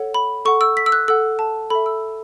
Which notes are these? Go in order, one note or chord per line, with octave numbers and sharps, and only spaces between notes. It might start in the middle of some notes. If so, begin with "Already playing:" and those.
Already playing: A4 C#5 F#5
B5
A4 F#5 C#6
E6
B6
E6
F#6
A4 F#5 E6
A5
A4 E5 B5
E6